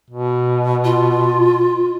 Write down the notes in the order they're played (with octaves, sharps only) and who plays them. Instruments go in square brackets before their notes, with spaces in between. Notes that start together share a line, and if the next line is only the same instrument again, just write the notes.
[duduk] B2
[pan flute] F4